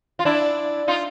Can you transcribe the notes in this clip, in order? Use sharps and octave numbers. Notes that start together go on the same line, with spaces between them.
F4
D4 E4
D#4 F4